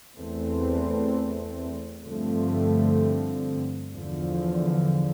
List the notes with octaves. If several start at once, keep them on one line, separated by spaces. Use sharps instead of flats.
E2 E3 A3 C4
G2 D3 F3 A3 C4
E2 D3 F3